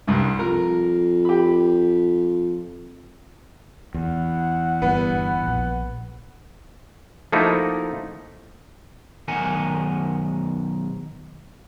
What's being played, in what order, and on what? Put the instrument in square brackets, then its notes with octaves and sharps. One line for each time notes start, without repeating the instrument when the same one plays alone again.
[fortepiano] C2 G2
[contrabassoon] F2 [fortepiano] A#4
[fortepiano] G4 B5
[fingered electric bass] E2 [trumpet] F#5
[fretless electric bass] G1 G2 [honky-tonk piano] B3
[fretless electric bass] A#1
[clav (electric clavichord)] F3 A3 A#3 D#4 E4 F#4
[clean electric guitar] B1 D#3 A#4 F#5 G#5